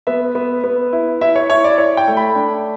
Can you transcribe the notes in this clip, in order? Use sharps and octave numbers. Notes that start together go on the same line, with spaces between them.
B3 E5
B3
B3
E4
E4 E5
C#5
E4 C#5
D5
E4 C#5
G5
A3
B5
D4